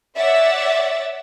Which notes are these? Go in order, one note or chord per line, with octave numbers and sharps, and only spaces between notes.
C#5 D5 E5 F#5 A6